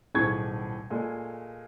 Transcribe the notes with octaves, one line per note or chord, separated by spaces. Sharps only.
D#1 B1 A2 G#4 C#6 G#6
A#2 G#3 A3